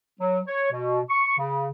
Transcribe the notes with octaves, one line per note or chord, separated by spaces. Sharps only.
F#3
C#5
B2
C#6
C#3